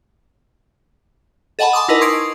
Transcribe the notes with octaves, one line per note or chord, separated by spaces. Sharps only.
A4 D#5 F#5 G#5 A5 B5
A5 C6 D6 D#6
D#4 E4 A#4 B4 D#5 A5
C6 C#6 D#6 G#6 C7 D7